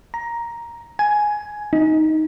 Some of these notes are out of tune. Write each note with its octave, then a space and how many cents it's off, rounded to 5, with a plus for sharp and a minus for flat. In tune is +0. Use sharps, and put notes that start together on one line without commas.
A#5 +5
G#5 +10
D#4 +10